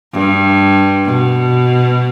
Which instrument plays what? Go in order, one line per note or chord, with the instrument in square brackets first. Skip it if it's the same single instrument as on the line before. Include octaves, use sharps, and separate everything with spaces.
[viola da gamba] G2
B2